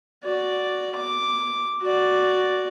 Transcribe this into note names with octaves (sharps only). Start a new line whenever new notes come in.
F#4 D5
D6
F#4 D5